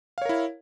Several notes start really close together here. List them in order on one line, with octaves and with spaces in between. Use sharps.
F5 C#5 A#4 E4